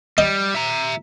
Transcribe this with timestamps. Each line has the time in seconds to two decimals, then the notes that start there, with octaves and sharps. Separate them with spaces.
0.18 G3 D#5
0.55 E5 A#5